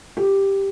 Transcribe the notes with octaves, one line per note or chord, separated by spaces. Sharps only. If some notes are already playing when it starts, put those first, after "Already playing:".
G4